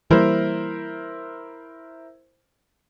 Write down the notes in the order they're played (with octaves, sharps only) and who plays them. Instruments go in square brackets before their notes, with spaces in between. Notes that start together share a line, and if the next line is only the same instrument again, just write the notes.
[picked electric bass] E3 G3 A#3 [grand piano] E4 A#4 C5